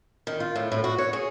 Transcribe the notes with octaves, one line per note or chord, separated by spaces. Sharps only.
D#3
F4
A2
A2
F#4
C#5
G#4